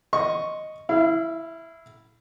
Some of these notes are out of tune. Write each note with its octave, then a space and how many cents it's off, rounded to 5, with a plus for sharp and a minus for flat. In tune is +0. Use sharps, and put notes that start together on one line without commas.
D#5 +0 C#6 +0
E4 +0 F5 -35